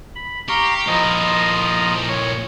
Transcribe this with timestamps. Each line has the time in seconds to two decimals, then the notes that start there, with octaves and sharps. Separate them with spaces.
0.15 B5
0.49 G4 F5 A#5 C#6
0.87 A#2 F3 E4 D#5 A#5
2.08 C#5